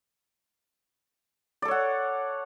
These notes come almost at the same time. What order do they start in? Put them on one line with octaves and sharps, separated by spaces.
D5 A4 C#5 F#5